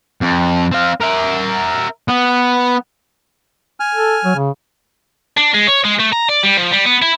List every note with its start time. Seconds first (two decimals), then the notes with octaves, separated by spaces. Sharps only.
0.21 F2
0.72 C4 F5
1.01 A#4 E5
2.08 B3
3.80 G#5 F6
3.94 A4
4.25 F#3
4.36 C#3
5.37 D4
5.54 G#3
5.67 C#5
5.84 G#3
5.99 A3
6.12 A#5
6.29 D5
6.43 G3
6.57 F3
6.72 G3
6.86 B3
7.02 E4